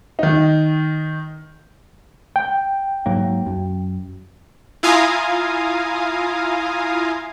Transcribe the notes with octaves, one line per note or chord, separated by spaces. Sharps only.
D#3 D#4
G5
G#2 F#3 A#3
F#2
E4 F4 F5 G#5 A#5 D#6